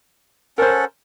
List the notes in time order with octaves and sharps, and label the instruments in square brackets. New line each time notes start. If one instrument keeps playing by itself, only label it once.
[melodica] C#4 A4 F#5 [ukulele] A#4 C5